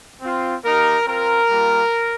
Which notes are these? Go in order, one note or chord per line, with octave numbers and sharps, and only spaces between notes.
C4 F4
A#3 D#4 G4 A#4
C4 F4 A#4
G3 A#3 F4